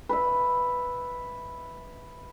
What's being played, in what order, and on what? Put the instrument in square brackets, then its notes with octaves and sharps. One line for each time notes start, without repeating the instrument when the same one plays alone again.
[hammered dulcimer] B4 E5